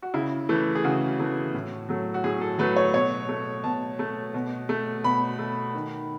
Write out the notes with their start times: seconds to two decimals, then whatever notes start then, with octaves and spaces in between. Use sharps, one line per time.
0.02 F#4
0.14 C#3 E4
0.49 E3 A3
0.75 G#4
0.84 C#3 F#4
1.19 E3 A3
1.54 A2
1.89 F#3 A3
2.14 F#4
2.24 A2 G#4
2.41 A4
2.58 F#3 A3 B4
2.76 C#5
2.94 B2 C#5
3.29 A3
3.64 B2 A5
3.99 A3
4.34 B2
4.69 A3
5.04 B2 B5
5.39 A3
5.75 D#3